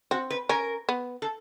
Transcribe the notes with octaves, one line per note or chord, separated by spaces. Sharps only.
C4 F#4
B4
C#4 A#4
B3
A4